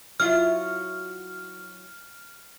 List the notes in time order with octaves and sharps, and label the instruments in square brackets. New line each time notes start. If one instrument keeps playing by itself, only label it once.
[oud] F#3 E4 F4 [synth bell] F6